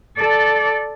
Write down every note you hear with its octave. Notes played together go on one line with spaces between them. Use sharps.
A4 D5